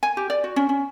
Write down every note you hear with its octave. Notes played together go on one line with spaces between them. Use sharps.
G#5
G4
D5
F#4
C#4
C#4